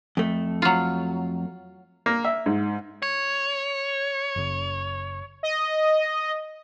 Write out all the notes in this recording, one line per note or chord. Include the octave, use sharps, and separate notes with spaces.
F2 A3
F#3 F4
A#3
E5
G#2
C#5
F#1 C#3
D#5